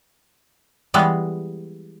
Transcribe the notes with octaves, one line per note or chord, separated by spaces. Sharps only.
E3 G3 G#3 B3